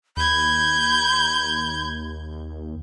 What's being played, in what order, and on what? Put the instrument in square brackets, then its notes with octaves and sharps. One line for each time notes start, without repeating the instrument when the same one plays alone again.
[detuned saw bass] D#2 [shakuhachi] B5 [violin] G6 G#6